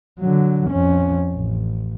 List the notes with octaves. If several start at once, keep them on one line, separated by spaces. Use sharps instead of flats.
D3 F#3
F2 C#4
A1